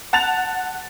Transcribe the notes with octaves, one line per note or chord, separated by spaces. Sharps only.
F#5 A5 A6 F7